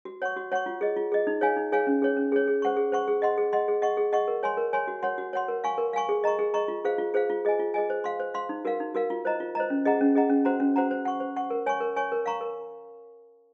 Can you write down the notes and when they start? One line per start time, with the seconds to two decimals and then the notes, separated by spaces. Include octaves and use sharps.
0.05 F#4
0.22 C#5 F#5 C#6
0.37 F#4
0.52 C#5 F#5 C#6
0.66 F4
0.81 G#4 D#5
0.97 F4
1.12 G#4 D#5
1.27 D#4
1.41 G#4 C#5 F5 G#5
1.56 D#4
1.72 G#4 C#5 F5 G#5
1.87 C#4
2.02 G#4 C#5
2.17 C#4
2.32 G#4 C#5
2.47 G#4
2.62 C5 F#5 C#6
2.77 G#4
2.92 C5 F#5 C#6
3.08 G#4
3.22 D#5 F#5 C6
3.38 G#4
3.53 D#5 F#5 C6
3.68 G#4
3.82 D#5 F#5 C#6
3.97 G#4
4.13 D#5 F#5 C#6
4.28 A#4
4.43 C#5 G#5 C6
4.57 A#4
4.73 C#5 G#5 C6
4.88 F#4
5.03 C#5 F#5 C6
5.18 F#4
5.33 C#5 F#5 C6
5.48 A#4
5.64 F5 G#5 C#6
5.78 A#4
5.93 F5 G#5 C#6
6.09 G#4
6.24 D#5 A#5 C#6
6.39 G#4
6.54 D#5 A#5 C#6
6.68 F4
6.84 G#4 C5 F5
6.98 F4
7.14 G#4 C5 F5
7.30 F4
7.45 G#4 D#5 G#5
7.59 F4
7.74 G#4 D#5 G#5
7.90 C5
8.04 F5 C6
8.20 C5
8.34 F5 C6
8.49 D#4
8.65 F#4 A#4 F5
8.80 D#4
8.95 F#4 A#4 F5
9.10 F4
9.25 C5 D#5 A#5
9.40 F4
9.55 C5 D#5 A#5
9.70 C#4
9.85 G#4 D#5 F#5 A#5
10.01 C#4
10.15 G#4 D#5 F#5 A#5
10.30 C#4
10.45 F#4 C5 F#5 A#5
10.60 C#4
10.76 F#4 C5 F#5 A#5
10.91 C5
11.05 F#5 C#6
11.20 C5
11.36 F#5 C#6
11.50 A#4
11.66 C#5 G#5 C#6
11.80 A#4
11.96 C#5 G#5 C#6
12.12 A#4
12.26 F5 A#5 C#6
12.41 A#4